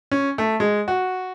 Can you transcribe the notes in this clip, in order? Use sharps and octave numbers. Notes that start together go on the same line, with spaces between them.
C#4
A3
G#3
F#4